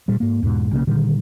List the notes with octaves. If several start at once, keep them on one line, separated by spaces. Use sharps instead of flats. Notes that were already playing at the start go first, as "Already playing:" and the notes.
A#2 G3
G#2 A#3
E2 G#2 B2
B1 C#3 E3 A#3
A#2 D3 D#3 G3